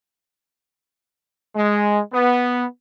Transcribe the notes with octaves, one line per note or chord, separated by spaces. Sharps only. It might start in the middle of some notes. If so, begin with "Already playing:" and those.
G#3
B3